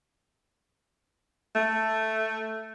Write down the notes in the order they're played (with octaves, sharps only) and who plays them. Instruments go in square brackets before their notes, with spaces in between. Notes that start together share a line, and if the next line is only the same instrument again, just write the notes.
[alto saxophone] A3